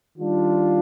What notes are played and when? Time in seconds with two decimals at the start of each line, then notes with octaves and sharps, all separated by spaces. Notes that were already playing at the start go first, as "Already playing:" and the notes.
0.19 D#3 G3 D4 F4